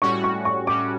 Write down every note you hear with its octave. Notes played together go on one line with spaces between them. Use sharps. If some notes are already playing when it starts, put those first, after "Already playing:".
A2 G3 C#4 F#4 C#6
C#6
C#6
A2 G3 C#4 F#4 D6